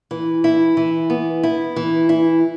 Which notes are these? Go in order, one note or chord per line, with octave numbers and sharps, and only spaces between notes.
E3
E4
E3
B3
E4
E3
E4